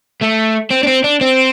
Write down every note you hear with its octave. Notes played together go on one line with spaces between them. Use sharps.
A3
C4
D4
C4
D4
C4